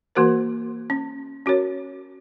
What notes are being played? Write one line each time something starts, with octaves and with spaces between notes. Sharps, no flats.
E3 A#3 F#4 A#4 C5
C#4
C#4 F#4 A#4 C#5